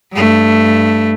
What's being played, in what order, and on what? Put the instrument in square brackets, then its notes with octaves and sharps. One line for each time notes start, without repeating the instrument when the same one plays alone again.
[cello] G2 A3